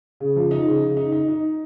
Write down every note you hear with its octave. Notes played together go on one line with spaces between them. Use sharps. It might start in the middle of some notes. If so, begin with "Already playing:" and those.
C#3
F3
D#4
C#3
C#3
D#4
D#4
D#4